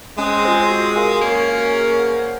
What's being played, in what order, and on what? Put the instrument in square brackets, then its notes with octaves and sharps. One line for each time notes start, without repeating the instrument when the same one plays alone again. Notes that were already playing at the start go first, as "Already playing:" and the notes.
[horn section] G#3 C4 [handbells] C#4
[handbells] F4 G#4 C5 D#5
F#4
A#4 F5 G#5
[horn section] A#3 C#4 [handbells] F#4
[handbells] A#4 F5 G#5
G#4
C5 F#5